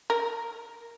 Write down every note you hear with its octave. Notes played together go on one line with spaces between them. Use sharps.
A#4